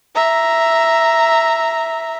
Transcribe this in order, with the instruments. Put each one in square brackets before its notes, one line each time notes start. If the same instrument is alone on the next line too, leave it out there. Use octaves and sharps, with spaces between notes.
[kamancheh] E5 A#5